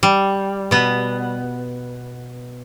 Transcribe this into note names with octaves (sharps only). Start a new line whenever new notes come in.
G3
B2 B3